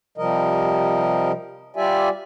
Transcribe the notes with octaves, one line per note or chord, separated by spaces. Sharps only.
C3 F3 G3 A#4 D#5
G3 F4 G4 D5 E5 G#5